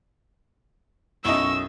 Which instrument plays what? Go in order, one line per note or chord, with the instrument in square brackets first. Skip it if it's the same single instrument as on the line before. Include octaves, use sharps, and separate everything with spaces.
[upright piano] B1 F#2 [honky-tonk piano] E4 D#5 [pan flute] C#6 [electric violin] E6